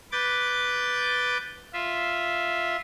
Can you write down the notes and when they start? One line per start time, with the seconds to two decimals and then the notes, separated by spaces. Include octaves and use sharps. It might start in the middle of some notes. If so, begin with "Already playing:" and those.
0.12 B4 D6 G6 A6
1.73 F4 E5